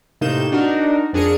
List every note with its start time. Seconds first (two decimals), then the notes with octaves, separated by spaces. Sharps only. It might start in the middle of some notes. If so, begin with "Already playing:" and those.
0.21 A2 C3 A#3 D#4 G6 E7
0.52 D4 D#4 F#4 A#4
1.13 F2 D4 G#4 A#4 C#7 D#7